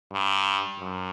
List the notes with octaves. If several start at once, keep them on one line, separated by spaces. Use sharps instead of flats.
G2
F#2